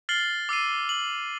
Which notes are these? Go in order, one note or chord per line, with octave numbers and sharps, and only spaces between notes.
F6 A6 C7 F#7 G7
D6 E6 C7 D#7
F#7